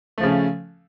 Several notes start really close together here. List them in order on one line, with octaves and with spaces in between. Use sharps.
A3 F3 C#3 C#4